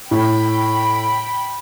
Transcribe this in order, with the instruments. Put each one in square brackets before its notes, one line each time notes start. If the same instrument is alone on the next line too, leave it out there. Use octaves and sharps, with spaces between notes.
[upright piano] A2 [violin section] G5 B5